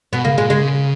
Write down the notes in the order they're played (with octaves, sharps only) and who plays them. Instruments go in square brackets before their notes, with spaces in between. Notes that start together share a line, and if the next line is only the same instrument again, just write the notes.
[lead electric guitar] B2 [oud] B3
[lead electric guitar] C#3 [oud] A#3
[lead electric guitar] A#2 [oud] G#3
[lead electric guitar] C#3 [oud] G#3